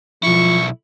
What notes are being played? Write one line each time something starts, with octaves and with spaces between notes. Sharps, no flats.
B1 F3 E4 C#6